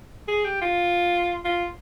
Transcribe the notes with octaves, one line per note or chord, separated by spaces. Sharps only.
G#4
G4
F4
F4